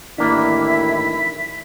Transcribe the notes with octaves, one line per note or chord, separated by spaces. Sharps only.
A1 D#3 A#3 D4 E4 B6